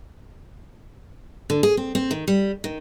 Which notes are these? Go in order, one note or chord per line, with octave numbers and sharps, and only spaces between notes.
D3
G#4
C4
C4
D#3
G3
D#3